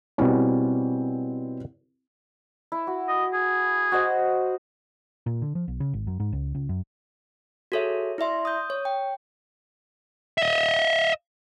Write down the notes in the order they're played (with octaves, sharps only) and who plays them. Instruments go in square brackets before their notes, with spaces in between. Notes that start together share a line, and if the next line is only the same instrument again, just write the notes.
[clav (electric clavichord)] B2 G3 C#4 [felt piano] C4 E4
[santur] E4
F#4
[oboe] D#5
G#4
[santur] F#4 C5 D#5
[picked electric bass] A#2
D3
F3
B1
C#3
G#1
F#2
G#2
C#2
C#2
F#2
[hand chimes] F#4 G#4 A4 C#5 E5
E4 D5 E5 C6
D#6 G6
C#5
G5
[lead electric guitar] D#5 E5